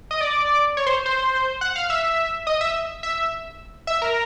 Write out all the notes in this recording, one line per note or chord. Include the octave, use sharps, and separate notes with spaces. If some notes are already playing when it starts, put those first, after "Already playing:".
D#5
D5
C#5
C5
C5
F#5
F5
E5
D#5
E5
E5
E5
A#4